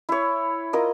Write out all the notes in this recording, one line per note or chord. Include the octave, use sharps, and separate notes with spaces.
E4 C#5
F4 A#4 D#5